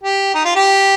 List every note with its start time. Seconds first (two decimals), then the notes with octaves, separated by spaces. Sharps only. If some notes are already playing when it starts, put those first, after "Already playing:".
0.03 G4
0.34 D#4
0.45 F4
0.55 G4